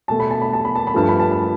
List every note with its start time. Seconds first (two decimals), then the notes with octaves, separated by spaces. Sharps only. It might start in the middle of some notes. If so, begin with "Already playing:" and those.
0.08 B2 A3 A5
0.20 B5
0.31 A5
0.41 B5
0.53 A5
0.65 B5
0.75 A5
0.87 B5
0.94 G2 F3 A3 A5
1.09 B5
1.20 A5
1.31 B5